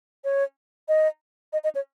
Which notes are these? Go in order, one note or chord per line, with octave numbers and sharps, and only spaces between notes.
C#5
D#5
D#5
D#5
C#5